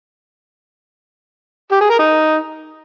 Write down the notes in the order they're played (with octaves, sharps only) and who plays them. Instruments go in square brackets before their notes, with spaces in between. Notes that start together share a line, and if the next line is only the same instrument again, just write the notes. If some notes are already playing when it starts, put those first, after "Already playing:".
[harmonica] G4
G#4
A#4
D#4